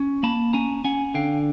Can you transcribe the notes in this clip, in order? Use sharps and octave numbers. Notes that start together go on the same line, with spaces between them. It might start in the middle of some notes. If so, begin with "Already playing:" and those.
Already playing: C#4
A#3 A5 B5
C#4 G#5 A#5
C#4 F#5 G#5
D3 F5 G5